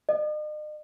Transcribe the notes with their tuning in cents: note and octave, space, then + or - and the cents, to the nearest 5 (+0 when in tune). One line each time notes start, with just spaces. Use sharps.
D#5 -45